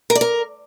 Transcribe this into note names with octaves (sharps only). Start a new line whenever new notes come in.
A#4
D5
A#4